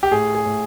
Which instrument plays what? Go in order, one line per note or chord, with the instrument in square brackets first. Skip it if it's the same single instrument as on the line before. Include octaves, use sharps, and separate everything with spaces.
[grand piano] G4
A2 G#4
G#4
A2